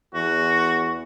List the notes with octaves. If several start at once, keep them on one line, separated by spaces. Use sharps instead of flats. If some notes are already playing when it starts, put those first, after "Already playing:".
E2 F#4